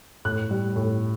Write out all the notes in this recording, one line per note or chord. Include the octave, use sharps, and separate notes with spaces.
A2 F#6
G3
A2